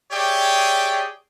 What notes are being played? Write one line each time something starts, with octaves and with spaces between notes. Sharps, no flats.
G4 G#4 C#5 D5 E5 G5